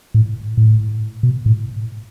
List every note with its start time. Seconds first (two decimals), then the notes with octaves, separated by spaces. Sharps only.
0.14 A2
0.57 A2
1.23 B2
1.46 A2